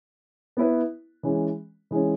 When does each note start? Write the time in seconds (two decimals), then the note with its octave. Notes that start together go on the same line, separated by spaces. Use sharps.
0.57 B3 E4 B4
1.23 E3 G#3 C#4
1.91 E3 G#3 C#4